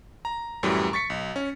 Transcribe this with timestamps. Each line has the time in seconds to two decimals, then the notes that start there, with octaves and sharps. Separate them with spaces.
0.25 A#5
0.63 F#2 A2 E3 F#3 G3
0.93 C#6 A6 B6 C#7
1.10 B1
1.36 C#4